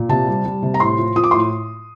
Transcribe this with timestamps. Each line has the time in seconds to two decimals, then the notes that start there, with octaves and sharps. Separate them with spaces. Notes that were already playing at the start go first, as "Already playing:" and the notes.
Already playing: A#2
0.09 C3 A5
0.27 G3
0.45 G3
0.63 C3
0.74 A#5
0.80 A2 C6
0.98 F3
1.16 F3 D#6
1.24 D6
1.31 A2 C6